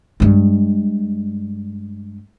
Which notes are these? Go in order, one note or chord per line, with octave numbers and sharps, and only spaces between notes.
G2 G#3